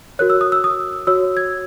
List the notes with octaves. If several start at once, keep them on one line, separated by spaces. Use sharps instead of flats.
F#4 A#4 C#5 F#6
E6
D#6
E6
D#6
F#4 C#5 E6
G#6